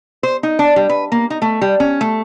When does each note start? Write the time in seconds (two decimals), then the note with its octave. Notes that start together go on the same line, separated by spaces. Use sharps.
0.23 C5
0.43 D#4
0.59 D4
0.76 G3
0.89 B4
1.12 A#3
1.30 D#4
1.42 A3
1.62 G3
1.80 C#4
2.01 A3